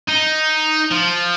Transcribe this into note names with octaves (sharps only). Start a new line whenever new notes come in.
D#4
F3